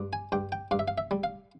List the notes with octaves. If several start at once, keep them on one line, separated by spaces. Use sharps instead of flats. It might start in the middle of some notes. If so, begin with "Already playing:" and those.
Already playing: G2
G#5
G2 G5
G5
G2 F5
E5
F5
E5
G3
F5